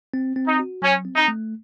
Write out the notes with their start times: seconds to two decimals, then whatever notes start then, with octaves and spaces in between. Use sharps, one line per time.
0.14 C4
0.36 C4
0.47 D#4
0.59 F#4
0.82 F#3 C#4
1.05 C4
1.16 D#4
1.28 A3